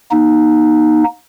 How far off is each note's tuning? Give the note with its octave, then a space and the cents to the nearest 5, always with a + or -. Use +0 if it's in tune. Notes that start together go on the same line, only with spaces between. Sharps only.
A#3 +40 D#4 -5